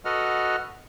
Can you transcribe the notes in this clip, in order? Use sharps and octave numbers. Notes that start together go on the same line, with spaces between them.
F#4 A4 B4 D#5 F#5 F6